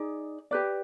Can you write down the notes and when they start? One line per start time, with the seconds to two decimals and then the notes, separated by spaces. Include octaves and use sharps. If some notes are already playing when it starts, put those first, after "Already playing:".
Already playing: D#4 G#4 D5
0.51 G4 B4 D5